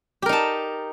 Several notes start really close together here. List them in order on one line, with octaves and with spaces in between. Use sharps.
G4 A#4 D#4 A5